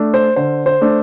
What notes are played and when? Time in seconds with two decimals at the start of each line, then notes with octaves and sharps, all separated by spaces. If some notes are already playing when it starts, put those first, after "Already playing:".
Already playing: A3 D4
0.14 C5
0.36 D3 C5
0.66 C5
0.81 A3 D4